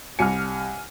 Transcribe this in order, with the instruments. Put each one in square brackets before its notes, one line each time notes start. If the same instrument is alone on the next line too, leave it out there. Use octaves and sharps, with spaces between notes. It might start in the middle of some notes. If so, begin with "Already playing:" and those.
[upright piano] C2 C#7 [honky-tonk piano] G#5 F6